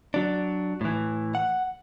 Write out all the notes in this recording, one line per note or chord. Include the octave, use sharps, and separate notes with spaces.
F#3 D4
A2 E3
F#5